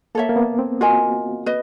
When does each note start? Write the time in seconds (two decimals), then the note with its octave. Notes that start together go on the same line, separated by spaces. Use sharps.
0.15 A#3 A4 C#5 E5
0.29 A#3
0.36 B3
0.59 C4
0.81 F4 F#4 A#4 D#5 G#5
1.46 B4 D#5